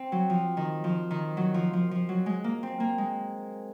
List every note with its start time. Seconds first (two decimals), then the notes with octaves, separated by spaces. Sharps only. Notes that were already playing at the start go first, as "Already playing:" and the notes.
Already playing: C4
0.12 F#3
0.30 F3
0.57 D#3
0.84 F3
1.11 D#3
1.37 F#3
1.54 F3
1.73 F3
1.91 F3
2.09 F#3
2.26 G#3
2.44 A#3
2.63 C4
2.80 A#3
2.98 G#3